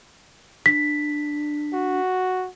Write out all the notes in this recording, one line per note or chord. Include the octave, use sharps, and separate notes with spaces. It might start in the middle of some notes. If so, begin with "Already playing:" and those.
D4 B6
F#4